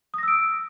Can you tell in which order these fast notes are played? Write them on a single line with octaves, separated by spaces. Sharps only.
D#6 A#6 E6 D7